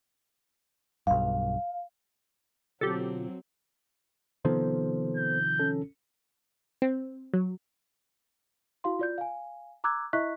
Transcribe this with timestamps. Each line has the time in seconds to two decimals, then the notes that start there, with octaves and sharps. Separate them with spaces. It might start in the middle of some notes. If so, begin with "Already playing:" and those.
1.07 B1 G2 F5
2.81 B2 D3 F#3 C4 F4 G4 A4
4.45 C3 D#3 F3 B3 A4 C5
5.16 G6
5.60 C#4 A4
6.82 C4
7.34 F#3
8.84 E4 F#4 F5 C6
8.99 F4 D5 G6
9.18 F5 G#5
9.84 A#5 D6 E6 F#6 G#6
10.13 E4 D#5 E5 C#6 F#6 B6